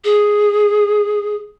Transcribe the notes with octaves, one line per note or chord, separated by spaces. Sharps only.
G#4